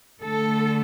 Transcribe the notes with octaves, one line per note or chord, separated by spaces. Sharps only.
D3 A3 A4